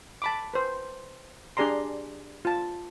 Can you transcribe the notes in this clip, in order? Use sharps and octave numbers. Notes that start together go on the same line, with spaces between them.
A5 B5 D6
B4 C5
D4 G4 G#4 D5 A#5 C6
F4 A5